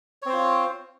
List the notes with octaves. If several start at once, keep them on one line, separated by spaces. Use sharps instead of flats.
C4 F4 C5 C#5